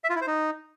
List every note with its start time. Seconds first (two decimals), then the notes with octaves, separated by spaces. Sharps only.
0.04 E5
0.10 F4
0.15 E4
0.21 C5
0.27 D#4